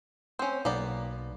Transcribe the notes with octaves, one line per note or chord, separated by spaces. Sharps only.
C4 C#4 C5
B1 A#3 B3 D5